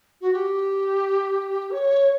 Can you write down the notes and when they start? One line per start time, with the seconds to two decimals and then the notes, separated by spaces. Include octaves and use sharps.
0.21 F#4
0.33 G4
1.71 C#5